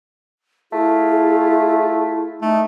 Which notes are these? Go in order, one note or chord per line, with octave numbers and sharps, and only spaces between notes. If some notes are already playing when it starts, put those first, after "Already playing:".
A3 E4 F4 G#4
A3 D#4